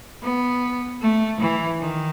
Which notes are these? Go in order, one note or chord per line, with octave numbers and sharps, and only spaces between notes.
B3
A3
E3
D#3